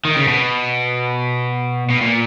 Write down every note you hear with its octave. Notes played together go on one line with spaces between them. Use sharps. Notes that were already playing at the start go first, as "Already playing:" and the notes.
D#3
C#3
B2
B2
A#2